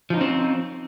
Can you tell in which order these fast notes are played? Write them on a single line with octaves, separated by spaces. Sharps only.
F3 D#4 C#4 C4